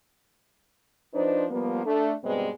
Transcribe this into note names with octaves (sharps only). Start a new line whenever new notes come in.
F3 D4 D#4 B4 C5
F3 G3 A#3 B3
A3 D4
G2 B2 G3 G#3 B3 C4